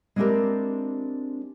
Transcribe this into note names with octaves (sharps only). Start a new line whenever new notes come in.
G#3 C4 D4 E4 G4 A#4